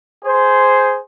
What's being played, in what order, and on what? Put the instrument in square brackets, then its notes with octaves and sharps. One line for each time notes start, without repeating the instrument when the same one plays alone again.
[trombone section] G#4 C5